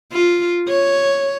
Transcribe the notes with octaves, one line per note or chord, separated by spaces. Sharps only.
F4
C#5